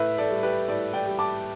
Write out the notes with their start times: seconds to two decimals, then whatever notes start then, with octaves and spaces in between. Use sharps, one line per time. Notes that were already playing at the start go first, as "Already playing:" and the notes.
Already playing: A2 B4 E5
0.18 A4 D5
0.31 G3
0.43 G4 B4
0.68 A2 A4 D5
0.93 D5 G5
1.07 G3
1.19 A5 D6